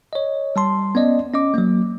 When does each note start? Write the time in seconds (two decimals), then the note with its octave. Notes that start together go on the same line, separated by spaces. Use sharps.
0.13 C#5 D#5
0.56 G3 A5 C6
0.95 B3 C#4 D5 D#5
1.34 C#4 D#5 D6
1.54 F#3 A#3